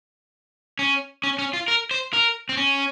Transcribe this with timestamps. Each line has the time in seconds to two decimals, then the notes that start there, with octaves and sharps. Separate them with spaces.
0.79 C#4
1.24 C#4
1.39 C#4
1.53 F4
1.68 A#4
1.91 C5
2.13 A#4
2.49 C4
2.57 C#4